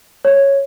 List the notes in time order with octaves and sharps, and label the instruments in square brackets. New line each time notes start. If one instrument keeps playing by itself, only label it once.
[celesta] C#5